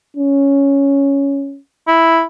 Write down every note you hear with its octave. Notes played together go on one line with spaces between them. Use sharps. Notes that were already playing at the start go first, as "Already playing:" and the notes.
C#4
E4